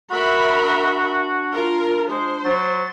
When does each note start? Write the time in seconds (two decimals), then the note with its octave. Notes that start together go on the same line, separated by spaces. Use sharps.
0.11 F#4 A#4 E5 B5
0.52 D4
1.52 F4 A#4
2.10 G#3 C5
2.45 F#3 A6